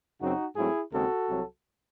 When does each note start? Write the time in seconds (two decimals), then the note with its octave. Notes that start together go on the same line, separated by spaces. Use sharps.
0.20 F#2 C#3 F#3 C4 D#4 F#4
0.56 G#2 F#3 A3 C4 E4 G#4
0.92 D#2 C#3 G#3 C4 F#4 A4
1.28 C2 C3 F#3